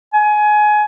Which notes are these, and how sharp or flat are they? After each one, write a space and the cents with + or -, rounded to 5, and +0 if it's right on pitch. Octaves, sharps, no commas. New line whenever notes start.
G#5 +20